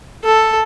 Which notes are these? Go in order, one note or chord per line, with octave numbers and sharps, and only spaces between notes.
A4